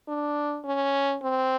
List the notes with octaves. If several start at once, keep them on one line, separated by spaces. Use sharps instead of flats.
D4
C#4
C4